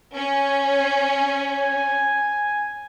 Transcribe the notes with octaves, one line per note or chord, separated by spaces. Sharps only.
C#4 G#5